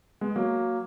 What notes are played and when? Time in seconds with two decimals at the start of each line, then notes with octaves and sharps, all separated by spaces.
0.21 G#3 B3
0.36 F#3 A#3